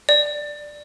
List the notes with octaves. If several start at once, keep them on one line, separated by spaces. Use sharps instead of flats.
D5